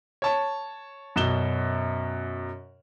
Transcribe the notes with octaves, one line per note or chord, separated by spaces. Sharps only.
C#5 A5
F#2 B2 E7 G7